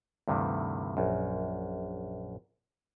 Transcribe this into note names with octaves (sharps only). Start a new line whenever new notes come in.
D2 G2 C3 D#3 E3
A#1 F#2